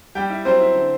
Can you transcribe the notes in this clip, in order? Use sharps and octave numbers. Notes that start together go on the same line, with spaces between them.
G3 G4 G5
E4
F#3 C4 C5
E4
D3